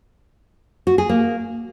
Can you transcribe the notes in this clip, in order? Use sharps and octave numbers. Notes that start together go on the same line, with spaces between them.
F#4
G#4
A#3